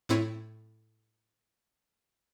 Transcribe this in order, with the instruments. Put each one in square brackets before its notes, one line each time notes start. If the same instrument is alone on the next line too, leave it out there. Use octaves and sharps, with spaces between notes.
[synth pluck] A2 C4 E4 C#5 D#7